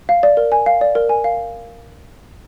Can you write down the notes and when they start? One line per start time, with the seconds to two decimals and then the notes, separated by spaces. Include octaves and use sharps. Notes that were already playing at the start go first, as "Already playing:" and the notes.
0.09 F5
0.23 D5
0.37 A#4
0.52 G#5
0.66 F5
0.81 D5
0.95 A#4
1.09 G#5
1.24 F5